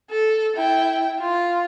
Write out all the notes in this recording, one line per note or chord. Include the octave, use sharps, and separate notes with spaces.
A4
E4 G5
F4